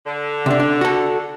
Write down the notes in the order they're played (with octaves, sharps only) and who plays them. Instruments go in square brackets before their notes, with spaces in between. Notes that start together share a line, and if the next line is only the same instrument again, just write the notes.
[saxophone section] D3
[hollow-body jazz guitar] C3 D4
D4
F#4 A4